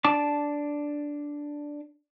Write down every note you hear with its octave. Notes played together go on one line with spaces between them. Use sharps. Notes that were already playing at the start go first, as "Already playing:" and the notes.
D4 A5 D6